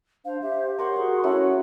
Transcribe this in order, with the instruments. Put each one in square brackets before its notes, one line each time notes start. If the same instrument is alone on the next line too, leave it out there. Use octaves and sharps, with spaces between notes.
[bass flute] D4 [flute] C5 [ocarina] F5
[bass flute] G4 [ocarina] E5
[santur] A#4 F#5 C#6 [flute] C#5 [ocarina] C6
[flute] F#4 [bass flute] G#4
[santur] F#3 A3 E4 [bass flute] C#4 [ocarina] C#5